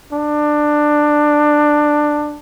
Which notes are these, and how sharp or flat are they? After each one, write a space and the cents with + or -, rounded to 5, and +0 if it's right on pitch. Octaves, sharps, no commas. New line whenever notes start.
D4 +15